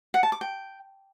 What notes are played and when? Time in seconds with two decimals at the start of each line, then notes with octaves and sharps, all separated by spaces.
0.14 F#5
0.23 A5
0.32 D6
0.41 G5